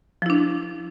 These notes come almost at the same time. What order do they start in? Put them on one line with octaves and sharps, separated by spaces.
F3 E4 D4